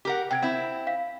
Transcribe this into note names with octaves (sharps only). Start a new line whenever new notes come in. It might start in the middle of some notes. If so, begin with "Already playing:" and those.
G4 A#4 F#5
C3 G5 G#6 D7
C4 E4 F#5
F5 B6